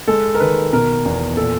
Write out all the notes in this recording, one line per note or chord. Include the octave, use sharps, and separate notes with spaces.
G#3 A4
A#4
D#3 B4
B2 A#4
E2
A#2 A4